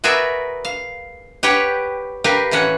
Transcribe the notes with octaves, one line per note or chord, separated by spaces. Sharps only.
F#4 G#4 A#4 B4 D5 E5
F5
G4 B4 C#5 F#5 G5
G4 A#4 B4 F5
A2 E3 C#4 F#5